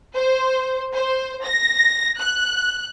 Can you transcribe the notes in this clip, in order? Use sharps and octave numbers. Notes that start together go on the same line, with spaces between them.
C5
C5
A#6
F#6